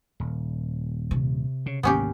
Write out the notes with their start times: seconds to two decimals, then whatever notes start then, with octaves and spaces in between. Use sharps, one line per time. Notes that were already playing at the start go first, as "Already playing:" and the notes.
0.20 D#1
1.11 C3
1.66 C#3
1.83 G#1 D2 A#3 B3 C#4 G4